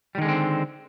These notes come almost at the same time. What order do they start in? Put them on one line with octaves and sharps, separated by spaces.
G3 D#3 G#3 D3 C4